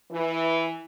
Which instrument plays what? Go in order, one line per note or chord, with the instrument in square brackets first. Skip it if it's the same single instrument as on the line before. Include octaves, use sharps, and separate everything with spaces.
[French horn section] E3